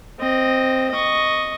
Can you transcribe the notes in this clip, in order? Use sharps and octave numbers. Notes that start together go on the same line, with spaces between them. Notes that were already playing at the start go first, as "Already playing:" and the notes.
C4 D#5
D#5 C#6